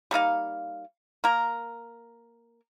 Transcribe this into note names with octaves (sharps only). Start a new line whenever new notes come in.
G3 A#3 D#4 F5
A#3 A#4